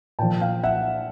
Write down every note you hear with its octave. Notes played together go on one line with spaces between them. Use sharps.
A#2 F3 G5 A5
F5 G5
E5 F#5